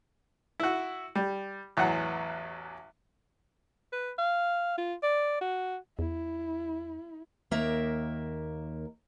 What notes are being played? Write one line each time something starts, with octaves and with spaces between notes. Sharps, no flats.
E4 F#4
G3
A1 E2 F#3 F#5
B4
F5
F4
D5
F#4
E2 E4
D#2 A#3 A#4 E5